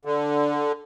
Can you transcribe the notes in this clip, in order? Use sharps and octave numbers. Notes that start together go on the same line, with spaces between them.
D3